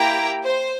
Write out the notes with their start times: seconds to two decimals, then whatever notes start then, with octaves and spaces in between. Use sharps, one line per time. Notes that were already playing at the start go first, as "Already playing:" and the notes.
Already playing: A#3 E4 G4 G5 A#5
0.44 C5